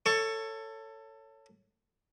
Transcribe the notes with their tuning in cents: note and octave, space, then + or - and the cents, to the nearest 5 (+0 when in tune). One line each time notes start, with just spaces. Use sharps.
A4 +20 C#5 +0